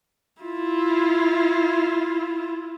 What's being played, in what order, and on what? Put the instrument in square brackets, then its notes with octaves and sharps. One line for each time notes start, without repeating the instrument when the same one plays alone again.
[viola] E4 F4